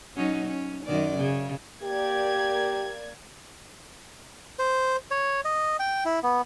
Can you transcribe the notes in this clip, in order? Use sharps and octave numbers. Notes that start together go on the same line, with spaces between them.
F#3 C#4 D#4
C#4
F#2 D#3 D5
C#3
A#3 G4 D5 G#6
C5
C#5
D#5
G5
E4
B3